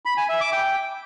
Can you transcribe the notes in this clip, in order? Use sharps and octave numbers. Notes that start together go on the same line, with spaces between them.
B5
G#5
E5
D6
G5